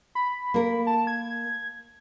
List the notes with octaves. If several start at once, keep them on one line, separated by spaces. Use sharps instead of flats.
B5
A#3 A#4
A5
G#6